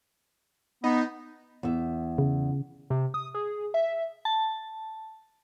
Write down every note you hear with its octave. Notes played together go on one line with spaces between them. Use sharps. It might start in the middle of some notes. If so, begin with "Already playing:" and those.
B3 D#4
E2 E5
C#3
C3
D#6
G#4
E5
A5